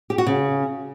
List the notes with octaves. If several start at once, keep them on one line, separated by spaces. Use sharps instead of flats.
G4
F#4
C#3